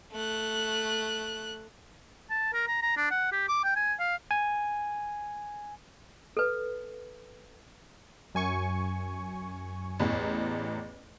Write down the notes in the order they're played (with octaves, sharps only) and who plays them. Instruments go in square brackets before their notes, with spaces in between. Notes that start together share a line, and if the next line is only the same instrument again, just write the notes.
[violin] A3 F#6
[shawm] A5
A#4
A#5
A#5
D4
F#5
G4
D6
G5
G#5
F5
[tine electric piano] G#5
[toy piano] A4 B4
[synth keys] F#2 G#5 C#6
[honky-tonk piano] A1 E2